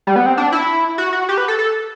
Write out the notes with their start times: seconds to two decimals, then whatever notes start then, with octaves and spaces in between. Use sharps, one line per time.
0.07 G3
0.16 B3
0.26 C4
0.37 D4
0.52 E4
0.98 F#4
1.13 F#4
1.29 G4
1.38 B4
1.48 A4
1.59 A4